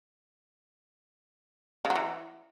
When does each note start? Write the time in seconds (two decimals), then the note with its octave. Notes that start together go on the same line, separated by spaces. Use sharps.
1.85 C#3
1.90 F#3
1.95 E3